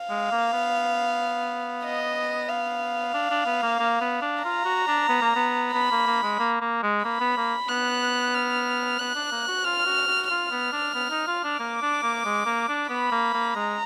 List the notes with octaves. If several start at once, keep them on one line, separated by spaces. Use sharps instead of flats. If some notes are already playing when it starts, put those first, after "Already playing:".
Already playing: F5
G#3
A#3
B3
D#5
F5
D4
D4
B3
A#3
A#3
B3
D4
F4 A#5
F#4
D4
B3
A#3
B3
B3 B5
A#3
A#3
G#3
A#3
A#3
G#3
A#3 B5
B3
A#3
B3 F#6
F6
B3 F#6
D4
A#3
F#4
F4 F6
F#4
F#4
F4 F6
B3
D4
B3
D#4
F4
D4
A#3 D6
D4
A#3
G#3
A#3
D4
B3 B5
A#3
A#3
G#3 A#5